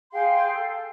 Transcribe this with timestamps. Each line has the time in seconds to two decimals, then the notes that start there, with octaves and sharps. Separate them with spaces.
0.12 G#4 F5 G5 C6
0.52 A4